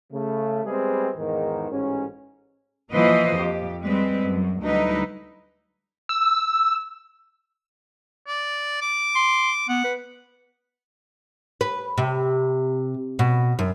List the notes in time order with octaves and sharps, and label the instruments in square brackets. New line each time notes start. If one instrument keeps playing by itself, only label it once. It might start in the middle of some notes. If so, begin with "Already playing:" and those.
[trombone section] C#3 A3
G3 G#3 B3 C4 G#4
E2 G#2 D#3
A1 G#2 C#4
[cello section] E3 F3 A#3 B4 C5 D#5
F2 G4
G3 G#3 C4 B4
F#2
D2 F#3 G3 D#4 E4 B4
[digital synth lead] E6
[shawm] D5
D6
[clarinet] C6
[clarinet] B3 [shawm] F#5
[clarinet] B4
[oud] B4
C3
B2
F#2